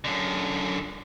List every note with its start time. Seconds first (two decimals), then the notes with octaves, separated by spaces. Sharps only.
0.04 F#2 D3